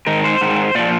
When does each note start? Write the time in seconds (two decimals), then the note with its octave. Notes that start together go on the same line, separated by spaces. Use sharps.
0.07 G#2 D#3 A#4
0.24 C5
0.41 G#2 D#3
0.75 A#2 F3 D5